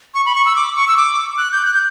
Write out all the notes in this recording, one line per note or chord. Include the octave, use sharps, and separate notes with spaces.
C#6
B5
C#6
E6
D6
C#6
E6
D6
F#6
G6
F#6
G6